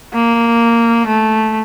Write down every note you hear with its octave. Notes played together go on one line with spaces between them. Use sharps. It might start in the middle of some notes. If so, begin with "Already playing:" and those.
A#3
A3